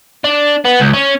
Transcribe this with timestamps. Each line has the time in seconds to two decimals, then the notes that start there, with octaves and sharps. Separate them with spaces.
0.24 D4
0.65 B3
0.80 C#2
0.94 C#4